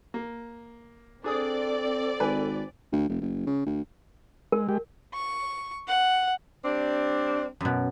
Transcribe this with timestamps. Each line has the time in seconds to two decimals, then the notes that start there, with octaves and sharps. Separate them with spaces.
0.14 A#3
1.24 C4 D4 G#4 A4 D5 D#6
2.20 G#1 B4 G#5
2.93 D2
3.09 F1
3.21 F#1
3.47 C#3
3.66 D2
4.52 G#3 A#4
4.69 G#3 G4
5.14 C#6
5.88 F#5
6.64 G3 C4 D4
7.61 F#2 B2